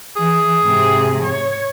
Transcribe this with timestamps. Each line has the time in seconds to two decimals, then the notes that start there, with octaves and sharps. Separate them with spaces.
0.16 E3 G#4
0.63 G#2 C3
1.24 C#5